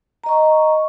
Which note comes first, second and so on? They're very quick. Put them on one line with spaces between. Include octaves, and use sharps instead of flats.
A#5 D#5 C#6